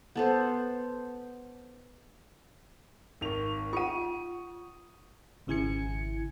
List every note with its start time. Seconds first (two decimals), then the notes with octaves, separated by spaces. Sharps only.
0.16 B3 A4 C5
3.21 G#1 D#4 C#6 F7
3.73 F4 F#5 C#6 D#6 D#7
5.47 G#1 C#3 E4 G#5 G#6 C#7